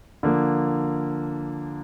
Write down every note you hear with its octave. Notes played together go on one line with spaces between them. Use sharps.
D3 F3 A#3